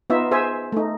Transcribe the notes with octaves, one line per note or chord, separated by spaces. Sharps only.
B3 D#4 F4 E5
G#4 C5 E5 G#5
A3 D#4